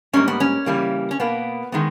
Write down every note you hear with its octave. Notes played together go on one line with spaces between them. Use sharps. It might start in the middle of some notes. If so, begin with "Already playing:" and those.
G#2 G3 A#3 C#4
B3
C#4
C#3 E3 G3 A#3
C#4
B2 A#3 B3
D#3 G#3 B3